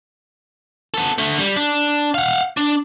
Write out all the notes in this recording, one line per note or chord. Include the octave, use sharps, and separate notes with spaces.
B3 A4
D3 A3
G3
D4
F5 F#5
D4